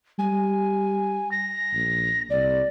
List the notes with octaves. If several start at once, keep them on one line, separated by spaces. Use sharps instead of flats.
G3 G#5
A#6
A#1
C2 D5